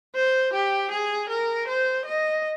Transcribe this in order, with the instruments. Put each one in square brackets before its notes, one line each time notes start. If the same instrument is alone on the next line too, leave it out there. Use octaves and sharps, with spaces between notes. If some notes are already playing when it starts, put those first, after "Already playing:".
[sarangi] C5
G4
G#4
A#4
C5
D#5